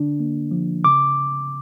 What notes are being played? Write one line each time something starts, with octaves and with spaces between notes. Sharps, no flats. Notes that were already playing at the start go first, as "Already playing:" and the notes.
Already playing: D3 D4
A#3
F3
C#3 D6